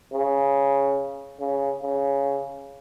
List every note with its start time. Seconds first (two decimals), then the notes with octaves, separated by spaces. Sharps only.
0.12 C#3
1.40 C#3
1.82 C#3